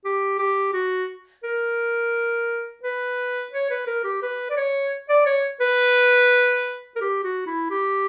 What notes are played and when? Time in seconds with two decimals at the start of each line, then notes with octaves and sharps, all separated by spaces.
0.05 G4
0.39 G4
0.73 F#4
1.44 A#4
2.83 B4
3.52 C#5
3.70 B4
3.87 A#4
4.04 G4
4.22 B4
4.50 D5
4.57 C#5
5.09 D5
5.26 C#5
5.61 B4
6.96 A#4
7.01 G4
7.24 F#4
7.46 E4
7.70 G4